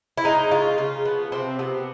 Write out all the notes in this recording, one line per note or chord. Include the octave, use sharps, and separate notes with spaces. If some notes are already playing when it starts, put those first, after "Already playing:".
E4
G#3 D#4
C#3 F4
C#3 F4
F3 B3
C3 C4
C3 B3